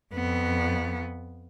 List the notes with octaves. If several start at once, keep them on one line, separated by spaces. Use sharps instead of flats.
F2 B3